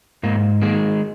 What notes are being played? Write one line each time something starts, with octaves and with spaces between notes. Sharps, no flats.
G#2 A#3
D#3 G#3 A#3